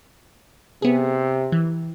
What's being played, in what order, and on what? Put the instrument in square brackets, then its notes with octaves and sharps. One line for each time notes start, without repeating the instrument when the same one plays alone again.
[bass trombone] C3 [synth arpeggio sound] B3 G#4
[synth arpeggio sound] E3